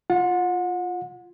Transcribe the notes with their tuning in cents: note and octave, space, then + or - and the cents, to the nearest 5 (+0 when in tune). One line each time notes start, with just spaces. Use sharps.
F4 +0 F#5 -35